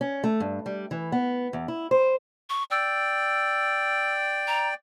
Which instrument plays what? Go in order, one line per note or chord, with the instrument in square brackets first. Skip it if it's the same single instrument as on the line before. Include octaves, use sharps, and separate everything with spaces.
[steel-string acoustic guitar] C#4
A3
G2
G3
E3
B3
E2
E4
C5
[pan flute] C#6
[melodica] D5 G5 [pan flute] E6
[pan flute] A#5